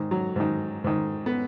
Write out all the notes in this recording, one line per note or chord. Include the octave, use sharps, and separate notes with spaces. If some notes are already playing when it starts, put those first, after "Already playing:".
Already playing: G#2 D#3
F#3
G#2 D#3
G#2 D#3
B3